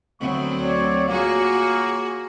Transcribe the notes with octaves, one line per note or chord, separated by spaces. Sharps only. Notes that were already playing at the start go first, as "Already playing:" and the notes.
D2 F#3 B3 C4 C#6
C#5 D5
A#3 F4 F#4 G#4 C#5